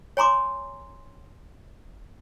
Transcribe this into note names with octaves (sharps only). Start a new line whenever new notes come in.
C#5 G#5 A#5 C6 D6